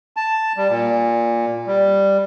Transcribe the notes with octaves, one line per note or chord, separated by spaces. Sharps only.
A5
G3
A#2
G3